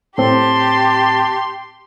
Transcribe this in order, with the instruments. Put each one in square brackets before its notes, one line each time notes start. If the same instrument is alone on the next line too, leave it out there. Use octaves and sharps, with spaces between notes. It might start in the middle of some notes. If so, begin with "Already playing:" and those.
[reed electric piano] A2 C4 [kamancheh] G4 C6 [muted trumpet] A5